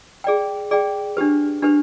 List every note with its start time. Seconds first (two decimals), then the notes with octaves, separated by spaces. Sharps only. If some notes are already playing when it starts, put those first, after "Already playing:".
0.24 G#4 D5 G5
0.71 G#4 D5 G5
1.17 D4 G4 B4
1.62 D4 G4 B4